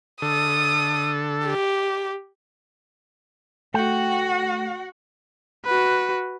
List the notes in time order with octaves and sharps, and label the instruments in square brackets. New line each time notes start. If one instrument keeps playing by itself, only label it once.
[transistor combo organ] D3 A4 [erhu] D#6
[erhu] G4
[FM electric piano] A3 [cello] F#4 F#5 [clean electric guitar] G5
[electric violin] F#4 B4